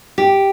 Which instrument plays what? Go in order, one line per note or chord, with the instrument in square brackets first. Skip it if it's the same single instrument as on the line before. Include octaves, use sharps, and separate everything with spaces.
[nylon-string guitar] G4